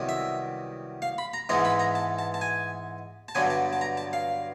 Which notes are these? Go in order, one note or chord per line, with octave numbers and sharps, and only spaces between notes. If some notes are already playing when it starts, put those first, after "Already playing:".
Already playing: C2 C3 D#3 F#3 B3
E5
F5
B5
A#5
G#2 E3 G#3 B3 A#5
B5
A#5
A5
A5
A5
G#5
A5
G2 D3 F#3 B3 G#5
A5
A5
A#5
A5
F5